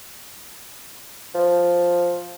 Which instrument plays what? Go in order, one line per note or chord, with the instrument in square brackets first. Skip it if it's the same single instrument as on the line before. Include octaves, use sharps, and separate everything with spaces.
[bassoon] F3